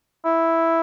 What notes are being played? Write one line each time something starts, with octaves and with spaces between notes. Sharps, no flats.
E4